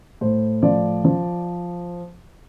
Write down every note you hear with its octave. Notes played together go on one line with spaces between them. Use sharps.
A2 C5
F3 D5
F3